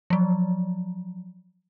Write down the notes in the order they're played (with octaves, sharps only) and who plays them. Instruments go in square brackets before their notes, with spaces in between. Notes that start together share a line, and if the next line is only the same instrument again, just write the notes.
[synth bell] F3 F#3